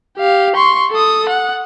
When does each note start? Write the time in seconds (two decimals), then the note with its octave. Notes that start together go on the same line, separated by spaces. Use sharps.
0.17 G4 F5
0.56 C6 C#6
0.91 A4 D#6
1.29 F#5